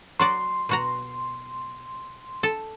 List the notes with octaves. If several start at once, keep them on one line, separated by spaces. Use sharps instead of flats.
F#3 F#4 D5 C6
B2 F#4 A#5
A4